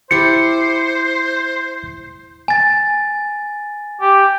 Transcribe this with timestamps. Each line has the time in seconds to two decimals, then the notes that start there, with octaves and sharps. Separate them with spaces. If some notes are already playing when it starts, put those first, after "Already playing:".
0.11 E4 G4 C5 D5 C#7
2.48 G#5 A6
4.01 G4